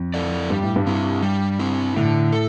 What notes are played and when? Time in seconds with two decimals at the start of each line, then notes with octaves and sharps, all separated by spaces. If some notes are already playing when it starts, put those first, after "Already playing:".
Already playing: F2
0.14 E4 A4 D5
0.50 G2 G3
0.63 A2
0.76 G2
0.86 C4 E4
1.23 G3
1.59 C4 E4
1.96 A2 D3
2.32 A4